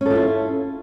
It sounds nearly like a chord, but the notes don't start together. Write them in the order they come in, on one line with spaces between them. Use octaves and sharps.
C#4 A4 F4 E4